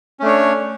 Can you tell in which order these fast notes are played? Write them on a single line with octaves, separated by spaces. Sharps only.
C#4 A3 D4 C#5